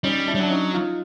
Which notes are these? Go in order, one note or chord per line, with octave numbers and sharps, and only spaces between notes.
G3 C#4 D#4
D4 E4
G3 C#4
F#3 D4
C#4 D#4
D#4 F4